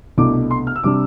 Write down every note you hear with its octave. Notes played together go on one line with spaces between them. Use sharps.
C2 B2 A3 D4 D6
C6
F6
E6
C3 G3 D4 D6